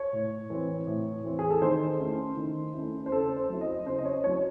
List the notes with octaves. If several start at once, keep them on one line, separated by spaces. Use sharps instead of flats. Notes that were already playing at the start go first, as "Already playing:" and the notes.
Already playing: C#5
A2
E3 C4
A2
E3 C4
G#4
A4
D#3 C5
A3 C#4 E4
D#3
A3 C#4 E4
C5
C#3 A4
C5
F#3 C4 E4
D#5
C#3 C5
D#5
C#5
F#3 C4 E4 C#5